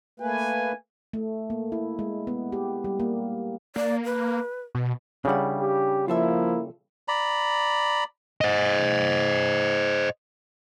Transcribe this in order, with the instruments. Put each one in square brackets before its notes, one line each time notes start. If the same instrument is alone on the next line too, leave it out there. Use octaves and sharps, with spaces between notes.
[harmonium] A3 A#3 B4 [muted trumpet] G#5
[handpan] A3
A#3
E4
G#3
B3
G4
G3
A#3
[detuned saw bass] A#3 [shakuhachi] D5
[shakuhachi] B4
[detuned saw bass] B2
[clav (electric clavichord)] C#3 G3 [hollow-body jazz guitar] D4 E4 F#5
[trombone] G4
[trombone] F3 [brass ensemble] A#3 E4 [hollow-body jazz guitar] F4 A4 E5
[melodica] D5 A#5 B5
[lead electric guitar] C5 D#5